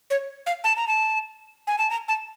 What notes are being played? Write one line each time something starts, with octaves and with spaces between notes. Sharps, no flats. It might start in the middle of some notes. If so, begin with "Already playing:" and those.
C#5
F5
A5
A#5
A5
G#5
A5
A#5
A5